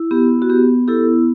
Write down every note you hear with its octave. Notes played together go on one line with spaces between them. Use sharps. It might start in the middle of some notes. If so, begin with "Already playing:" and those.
Already playing: E4
B3 G4
F#4
B3 G4
E4 G4 A4